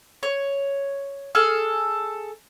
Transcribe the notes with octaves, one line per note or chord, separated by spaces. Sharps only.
C#5
G#4 A4 F6